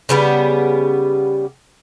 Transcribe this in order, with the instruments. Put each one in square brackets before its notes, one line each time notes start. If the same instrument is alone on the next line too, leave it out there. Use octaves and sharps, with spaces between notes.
[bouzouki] C#3 G3 B3 G4